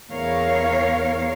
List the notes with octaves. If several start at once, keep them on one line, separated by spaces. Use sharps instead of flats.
E2 A#4 C#5 F5